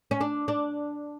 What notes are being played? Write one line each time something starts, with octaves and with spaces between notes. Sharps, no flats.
C#4
D4
D4